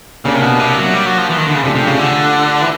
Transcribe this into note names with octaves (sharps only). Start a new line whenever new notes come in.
C#3 A#3 D4 G4 A#4 C#5
C3
B2
C3
F#3
G3
F#3
F3
E3
D#3
D3
C#3
C3 F3 A3 D4 G4
C3
C#3
D3
E3